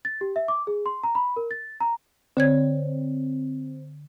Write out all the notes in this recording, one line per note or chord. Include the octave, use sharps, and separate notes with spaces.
A6
G4
E5
D6
G#4
C6
A#5
B5
A#4
A6
A#5
D3 C4 C#5 G#6